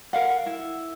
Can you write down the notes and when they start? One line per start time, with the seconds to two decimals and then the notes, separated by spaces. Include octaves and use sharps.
0.13 A#4 F5 F#5
0.46 E4